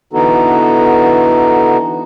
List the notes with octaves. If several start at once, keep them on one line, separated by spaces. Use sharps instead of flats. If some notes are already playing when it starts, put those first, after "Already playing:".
D3 E3 B3 D#4 F#4 A4